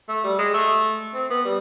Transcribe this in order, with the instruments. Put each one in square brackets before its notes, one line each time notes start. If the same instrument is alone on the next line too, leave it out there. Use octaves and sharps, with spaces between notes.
[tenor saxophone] A3
G3
G#3
A3
C4
B3
G3